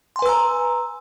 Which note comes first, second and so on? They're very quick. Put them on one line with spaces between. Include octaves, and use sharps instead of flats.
C6 G#5 B4 E6 A#5